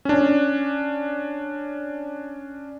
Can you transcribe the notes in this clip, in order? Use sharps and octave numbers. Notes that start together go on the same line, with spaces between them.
C#4 D4